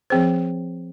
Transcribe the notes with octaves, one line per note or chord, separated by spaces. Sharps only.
F3 C4 G#4 C5